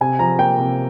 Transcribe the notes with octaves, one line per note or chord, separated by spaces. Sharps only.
C3 G#5
F3 A#5
A#3 G5
C3